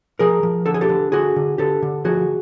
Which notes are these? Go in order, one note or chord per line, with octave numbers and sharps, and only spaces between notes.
F3 G#4 A#4
F3
D3 A4
G#4
G4 A4
D3
D3 F#4 G#4
D3
D3 G4 A4
D3
F3 F#4 G#4